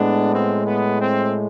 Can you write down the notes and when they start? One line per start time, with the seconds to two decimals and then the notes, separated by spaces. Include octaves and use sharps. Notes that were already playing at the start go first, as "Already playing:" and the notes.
Already playing: A2 G#3 B3 D4
0.33 C4
0.67 B3
1.00 C4